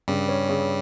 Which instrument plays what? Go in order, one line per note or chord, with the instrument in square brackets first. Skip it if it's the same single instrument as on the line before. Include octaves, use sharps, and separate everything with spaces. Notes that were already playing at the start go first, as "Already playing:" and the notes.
[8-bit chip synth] G2 G3 [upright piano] C#3
[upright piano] C#4
C#3